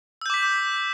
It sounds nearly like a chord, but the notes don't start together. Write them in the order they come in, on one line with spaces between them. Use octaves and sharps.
E6 G6 D6 B6